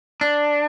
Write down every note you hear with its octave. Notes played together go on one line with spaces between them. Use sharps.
D4